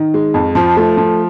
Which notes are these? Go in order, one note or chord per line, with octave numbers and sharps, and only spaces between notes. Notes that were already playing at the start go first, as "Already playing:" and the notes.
Already playing: D#3
G#3
F2
F3
A3
F3